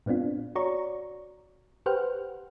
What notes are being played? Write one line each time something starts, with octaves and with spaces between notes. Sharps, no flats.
A#2 B3 C4 D4 F4
F#4 C#5 D5 A#5 C#6
G4 B4 C5 F#5 G5 F6